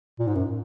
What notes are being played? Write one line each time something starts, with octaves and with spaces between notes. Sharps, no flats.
A#2
G#2
F#2